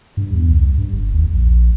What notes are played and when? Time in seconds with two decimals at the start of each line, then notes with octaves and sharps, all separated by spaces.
0.17 G2
0.33 E2
0.50 C2
0.77 G2
0.93 F#1
1.13 D#2
1.33 A#1